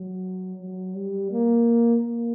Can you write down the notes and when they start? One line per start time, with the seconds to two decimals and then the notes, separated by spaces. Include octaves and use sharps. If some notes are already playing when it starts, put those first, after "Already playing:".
Already playing: F#3
0.61 F#3
0.96 G3
1.32 A#3
2.03 A#3